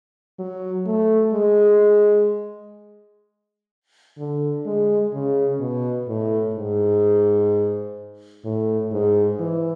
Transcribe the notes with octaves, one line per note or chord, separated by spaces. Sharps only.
F#3
A3
G#3
D3
G#3
C#3
B2
A2
G#2
A2
G#2
E3